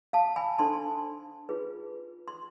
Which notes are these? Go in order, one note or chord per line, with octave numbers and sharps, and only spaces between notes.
F5 A5
G#5 B5
D4 A4 C5 A5 C6
F4 G#4 B4
C6